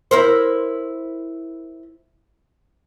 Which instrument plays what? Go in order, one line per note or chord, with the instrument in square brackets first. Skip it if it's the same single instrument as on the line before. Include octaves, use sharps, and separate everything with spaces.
[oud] E4 A#4 C5